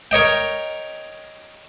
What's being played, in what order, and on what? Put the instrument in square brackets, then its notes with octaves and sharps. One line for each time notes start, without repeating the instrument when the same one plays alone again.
[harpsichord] A#4 C#5 D#5 G5